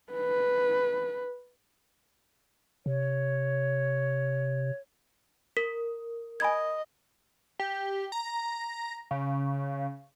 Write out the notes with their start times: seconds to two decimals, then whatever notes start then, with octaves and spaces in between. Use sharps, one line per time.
0.13 B4
2.86 C3 C#5
5.57 A#4 B6
6.40 D#5 G#5 B5 G#6
7.59 G4
8.12 A#5
9.11 C#3